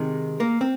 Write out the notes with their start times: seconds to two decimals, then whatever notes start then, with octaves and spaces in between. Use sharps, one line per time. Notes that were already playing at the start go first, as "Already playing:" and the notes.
Already playing: C3 D#3 G#3
0.40 A#3 A#4
0.61 C4